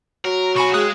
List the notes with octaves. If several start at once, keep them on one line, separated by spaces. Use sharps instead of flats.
F#3 A#4
B1 F#4 G#5 B5 C#6
G#3 G#4 F5 G5 D#6 F#6